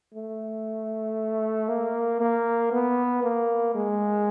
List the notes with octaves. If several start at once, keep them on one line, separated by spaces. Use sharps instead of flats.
A3
A#3
A#3
B3
A#3
G#3